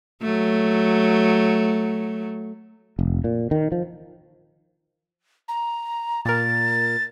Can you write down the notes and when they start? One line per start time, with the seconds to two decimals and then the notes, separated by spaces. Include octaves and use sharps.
0.22 F#3 A3
2.99 F1
3.24 A#2
3.51 D#3
3.72 F3
5.48 A#5
6.25 A#2 A#4 A6